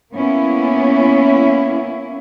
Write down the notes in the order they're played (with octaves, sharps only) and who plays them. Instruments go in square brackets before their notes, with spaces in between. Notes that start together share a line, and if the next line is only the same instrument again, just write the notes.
[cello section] A#3 B3 C#4 E4